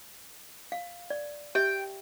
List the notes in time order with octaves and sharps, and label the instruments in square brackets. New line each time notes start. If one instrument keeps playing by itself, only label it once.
[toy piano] F5
D5
[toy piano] G4 E5 [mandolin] G5